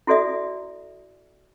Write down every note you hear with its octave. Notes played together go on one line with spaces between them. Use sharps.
E4 F#4 A4 D5 E5 D#6